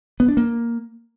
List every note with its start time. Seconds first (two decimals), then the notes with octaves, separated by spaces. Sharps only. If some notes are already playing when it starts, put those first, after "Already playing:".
0.20 B3
0.28 D4
0.37 A#3